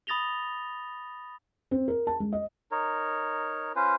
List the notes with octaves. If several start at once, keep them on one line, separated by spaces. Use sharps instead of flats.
B5 D#6 A6 A#6 F7 G7
C4
A#4
A5
G#3
D#5
D#4 A#4 C#5
C#4 F4 B4 C5